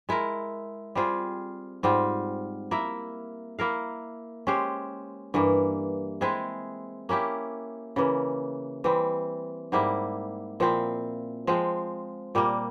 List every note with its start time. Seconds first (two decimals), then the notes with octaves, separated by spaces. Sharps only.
0.09 G#3 E4 A#4
0.95 G3 C4 F4 G#4
1.83 G#2 G3 C4 F4
2.71 A#3 E4 A#4 E5
3.59 A#3 E4 A#4 F5
4.47 G#3 C#4 G4 C5
5.34 G2 E3 A#3
6.21 G#3 C4 E4 G#4
7.09 A#3 C#4 E4 G4
7.96 C#3 E3 A#3
8.84 E3 G3 C4
9.72 G#2 G3 A#3 E4
10.60 A#2 F3 C4 E4
11.47 F3 G#3 C4
12.35 A#2 G3 A#3